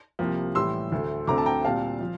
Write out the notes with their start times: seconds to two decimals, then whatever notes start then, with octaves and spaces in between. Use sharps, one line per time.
0.19 C2 C3 F3 A#3
0.55 A2 E3 G3 C6 E6
0.92 D2 D3 A3
1.27 D2 D3 A3 C4 A#5 D6
1.38 A5
1.46 G5 A#5
1.65 A#2 G3 C4 F5 A5
2.01 F3